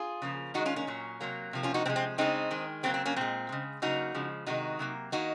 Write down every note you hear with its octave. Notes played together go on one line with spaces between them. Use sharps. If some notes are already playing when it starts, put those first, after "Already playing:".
Already playing: F4 G#4
C#3 F3 A#3
D#3 G#3 D#4 F#4
C#4 F4
A#3 C#4
A#2 F#3 A#3
C3 F#3 A#3
C3 F3 A#3
C#4 F4
D#4 F#4
C3 F3 G#3 C4
C4
C#3 G#3 C4 D#4
D#3 G#3
C#3 F#3 A#3 C4
C4
A#3 C#4
A#2 G#3 C4
C#3 G#3
C#3 F#3 A#3 D#4 F#4
C#3 F3 G#3
C3 D#3 G#3 D#4 F#4
C3 F#3 A#3
D#3 A#3 D#4 F#4